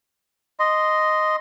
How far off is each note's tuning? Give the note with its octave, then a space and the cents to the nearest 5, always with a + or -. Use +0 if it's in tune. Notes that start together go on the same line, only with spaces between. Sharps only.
D#5 +0 C6 -10